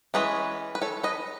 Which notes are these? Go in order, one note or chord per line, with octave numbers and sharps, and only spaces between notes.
E3 G#3 C#4 G#4 B4
B4
A4 C#5
B4 D#5